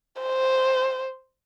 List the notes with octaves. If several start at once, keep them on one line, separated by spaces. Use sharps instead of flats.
C5